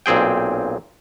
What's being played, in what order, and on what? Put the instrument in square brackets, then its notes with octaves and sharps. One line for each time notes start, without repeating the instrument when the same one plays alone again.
[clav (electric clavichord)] B1 A#2 C4 G#4 G5